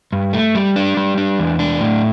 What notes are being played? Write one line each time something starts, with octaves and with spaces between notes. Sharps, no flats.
G2
A3
G3
D4
G3
D4
E2
D4
A2